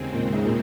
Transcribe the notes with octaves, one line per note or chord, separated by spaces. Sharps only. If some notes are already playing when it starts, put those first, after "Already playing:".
Already playing: D#2 C#3 G#3 C4
A#2
G#2
A#2